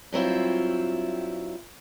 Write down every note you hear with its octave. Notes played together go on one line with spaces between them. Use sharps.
G2 F#3 C4 E4 F4